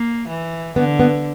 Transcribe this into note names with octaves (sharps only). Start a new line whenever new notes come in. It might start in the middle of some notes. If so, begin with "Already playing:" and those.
Already playing: A#3
E3
D3 B3
B3